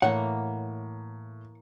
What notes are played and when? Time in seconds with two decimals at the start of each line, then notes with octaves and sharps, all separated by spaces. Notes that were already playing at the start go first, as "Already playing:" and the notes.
0.02 A2 E3 A#3 C#5 F#5